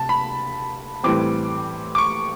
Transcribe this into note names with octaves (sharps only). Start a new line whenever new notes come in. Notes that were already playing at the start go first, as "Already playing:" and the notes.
Already playing: C3 A5
B5
A2 E3 G3 C4 D6
D6
C#6